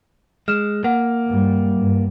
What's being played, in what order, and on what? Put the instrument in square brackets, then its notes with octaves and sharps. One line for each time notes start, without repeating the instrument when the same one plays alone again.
[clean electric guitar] G#3 [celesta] F6 E7
[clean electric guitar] A#3 [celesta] F#5
[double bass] G2 G3
G2